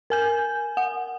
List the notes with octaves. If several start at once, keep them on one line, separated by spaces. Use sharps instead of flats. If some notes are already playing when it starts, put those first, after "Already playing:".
A#4 G#5 G6
F#5